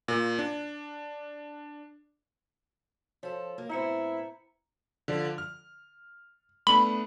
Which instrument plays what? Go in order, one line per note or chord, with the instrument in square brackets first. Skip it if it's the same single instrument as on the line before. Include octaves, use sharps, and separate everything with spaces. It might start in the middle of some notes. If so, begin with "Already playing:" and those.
[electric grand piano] A#2
D4
[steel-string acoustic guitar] F3 A4 [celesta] C#5
[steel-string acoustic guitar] A#3
[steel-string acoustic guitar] A2 B3 C4 [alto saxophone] E4 [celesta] A#5 C#7
[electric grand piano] D3 F3 D5
F6
[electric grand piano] A3 B3 D4 [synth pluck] B5